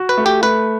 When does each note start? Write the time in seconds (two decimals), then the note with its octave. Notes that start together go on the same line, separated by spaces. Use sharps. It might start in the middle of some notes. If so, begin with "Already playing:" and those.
Already playing: F#4
0.09 B4
0.18 A3
0.26 G4
0.42 A3 B4